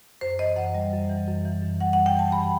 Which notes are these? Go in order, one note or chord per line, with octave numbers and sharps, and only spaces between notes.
F#2 C5
E3 D#5
F#2 F#5
G3
F#2
E3
F#2
E3
F#2
G3 F#5
F#2 F#5
G5
E3 A5
G2 B5